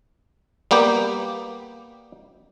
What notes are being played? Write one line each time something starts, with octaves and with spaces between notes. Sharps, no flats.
G3 A#3 B3 G4